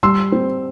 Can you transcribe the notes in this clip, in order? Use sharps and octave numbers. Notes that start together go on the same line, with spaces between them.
G3 C6 E6
C4